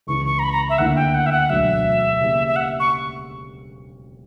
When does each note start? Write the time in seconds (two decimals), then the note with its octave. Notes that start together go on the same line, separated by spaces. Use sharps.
0.07 C#2 C#3 E3 C#6
0.26 C#6
0.39 A#5
0.43 B5
0.52 A#5
0.69 E5
0.78 D2 D3 A#3 E4 F#5
0.96 G5
1.15 F#5
1.26 E5
1.32 F#5
1.50 E1 D2 D3 F#3 E5
2.21 C#3 E3 G3 A#3
2.48 E5
2.56 F#5
2.80 C#6